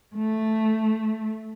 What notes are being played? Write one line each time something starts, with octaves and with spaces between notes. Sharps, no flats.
A3